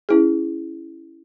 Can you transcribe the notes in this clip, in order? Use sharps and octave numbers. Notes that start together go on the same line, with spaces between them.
C#4 E4 G#4